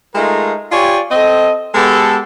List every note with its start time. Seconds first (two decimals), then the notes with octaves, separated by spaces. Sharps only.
0.15 G#3 A3 D#4 F4 A#4
0.71 F4 G4 C#5 D5 G#5
1.11 C4 A4 D#5
1.75 G#3 B3 G4 A4